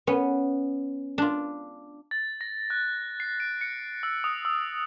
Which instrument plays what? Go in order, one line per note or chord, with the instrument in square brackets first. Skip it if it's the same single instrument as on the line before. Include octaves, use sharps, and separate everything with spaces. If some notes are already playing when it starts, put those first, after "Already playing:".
[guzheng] B3 C#4
D4 F4
[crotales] A6
A#6
F#6
C7
D7
C#7
E6
D#6
E6